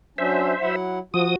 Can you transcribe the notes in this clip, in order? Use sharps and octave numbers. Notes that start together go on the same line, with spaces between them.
F#3 C#4 D4 C5 E5
F#3 E4 F#5
F3 F#4 D#6